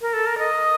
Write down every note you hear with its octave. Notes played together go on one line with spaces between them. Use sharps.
A#4
A4
A#4
D#5